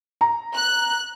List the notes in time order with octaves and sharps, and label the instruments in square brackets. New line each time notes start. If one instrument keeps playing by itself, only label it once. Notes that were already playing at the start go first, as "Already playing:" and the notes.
[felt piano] A#5
[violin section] F#6